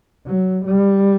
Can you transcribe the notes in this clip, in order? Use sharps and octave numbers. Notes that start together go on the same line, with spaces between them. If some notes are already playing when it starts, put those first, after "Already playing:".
F#3
G3